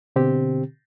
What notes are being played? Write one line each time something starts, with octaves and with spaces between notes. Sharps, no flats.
B2 D3 C4 G4